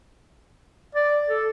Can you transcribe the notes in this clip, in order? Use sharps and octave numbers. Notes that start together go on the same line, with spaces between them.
D5
A4